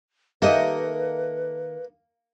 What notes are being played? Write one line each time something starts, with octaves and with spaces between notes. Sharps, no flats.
D#3 A#3 G4 A4 B4 D#5 E5 F#5